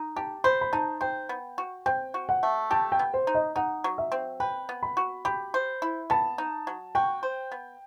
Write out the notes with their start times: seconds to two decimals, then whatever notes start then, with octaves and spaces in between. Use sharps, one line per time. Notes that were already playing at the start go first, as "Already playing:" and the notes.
Already playing: D#4
0.16 G4 A5
0.44 C5 B5
0.61 B5
0.73 D#4 A5
1.01 C5 G5
1.29 B3
1.58 F#4
1.86 C4 G5
2.14 F#4
2.29 F#5
2.43 A3
2.71 G4 A5
2.92 G5
2.99 B3
3.14 C5
3.27 D#4
3.35 D#5
3.56 D#4 F#5
3.84 F#3
3.98 E5
4.12 C4
4.40 B4 G5
4.69 B3
4.83 B5
4.97 F#4
5.25 G4 B5
5.54 C5
5.82 E4
6.10 B3 A5
6.38 D#4
6.67 F#3
6.95 F#4 G5
7.23 C5
7.52 B3